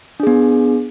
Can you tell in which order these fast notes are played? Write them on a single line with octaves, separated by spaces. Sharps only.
D4 G#4 B3